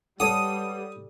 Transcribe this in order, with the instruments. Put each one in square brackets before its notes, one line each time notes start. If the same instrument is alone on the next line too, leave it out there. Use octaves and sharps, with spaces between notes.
[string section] G3 [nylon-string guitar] A4 [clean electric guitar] B4 C#5 F#5 [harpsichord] D#6